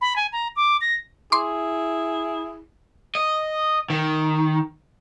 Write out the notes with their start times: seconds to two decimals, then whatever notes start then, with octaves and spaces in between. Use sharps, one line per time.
0.01 B5
0.16 G#5
0.32 A#5
0.56 D6
0.81 A#6
1.32 E4 G#4 C6 D6
3.15 D#5
3.90 D#3